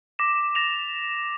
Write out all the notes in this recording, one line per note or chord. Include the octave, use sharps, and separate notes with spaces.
D6 A#6 B6 E7
A6 A#6 E7 F7